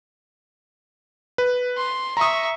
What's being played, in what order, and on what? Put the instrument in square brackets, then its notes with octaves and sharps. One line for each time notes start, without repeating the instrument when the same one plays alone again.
[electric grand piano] B4
[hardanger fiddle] C6
[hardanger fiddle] E5 C#6 [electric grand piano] A#5 D#6